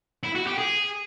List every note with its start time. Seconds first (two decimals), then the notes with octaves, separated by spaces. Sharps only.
0.23 E4
0.35 F#4
0.46 G4
0.58 G#4